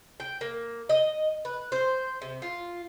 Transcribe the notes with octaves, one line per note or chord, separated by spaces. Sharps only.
G5
A#3
D#5
B4
C5
C3
F4